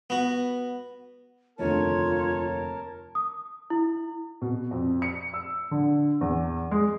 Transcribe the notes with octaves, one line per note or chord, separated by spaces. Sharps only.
B3 F#4
F1 D#2 D3 F4 A#4 C#5 A5
D#6
E4
B2
F2
C#7
E6
D3
E2
G#3